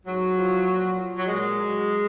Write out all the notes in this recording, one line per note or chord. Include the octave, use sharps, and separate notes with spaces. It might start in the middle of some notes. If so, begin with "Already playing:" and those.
G#2 F#3
F3
A#2
F3
F#3
A#2 G#3
F#3